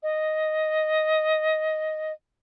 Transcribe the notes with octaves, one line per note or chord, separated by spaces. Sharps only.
D#5